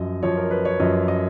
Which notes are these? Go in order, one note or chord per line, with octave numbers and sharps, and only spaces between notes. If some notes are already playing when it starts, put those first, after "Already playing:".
Already playing: F#2 F3 D#5
F#2 F3 C#5
A#4
B4
C#5
F#2 F3 D#5
D#5